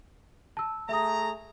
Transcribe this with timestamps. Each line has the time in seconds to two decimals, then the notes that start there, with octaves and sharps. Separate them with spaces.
0.57 A5 E6
0.89 A3 G#4 E5 A#5 D#6